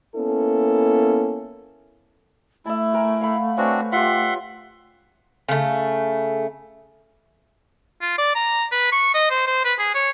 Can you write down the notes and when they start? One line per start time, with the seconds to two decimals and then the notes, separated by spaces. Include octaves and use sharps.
0.15 A#3 B3 C#4 E4 A4
2.66 A3 E4 E5 A5
2.94 A#4 G#5
3.21 F5 F#5 B5
3.57 C4 D4 F#4 B4 C#5 G#5
3.92 F4 G4 E5 F#5 C6
5.49 C#3 A3
8.01 F4
8.18 D5
8.35 A#5
8.72 B4
8.92 C#6
9.14 D#5
9.30 C5
9.47 C5
9.65 B4
9.79 G#4
9.95 C#5